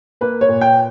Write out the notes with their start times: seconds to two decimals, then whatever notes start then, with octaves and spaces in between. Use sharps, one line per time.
0.21 A#3 B4
0.41 C#5
0.49 A#2
0.61 G5